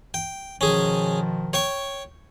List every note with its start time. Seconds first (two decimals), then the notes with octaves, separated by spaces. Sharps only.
0.14 G5
0.61 B2 D#3 F3 C#4 G#4
1.53 C#5 G5 C#6